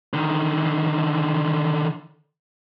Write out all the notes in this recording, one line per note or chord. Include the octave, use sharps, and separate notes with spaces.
D3 D#3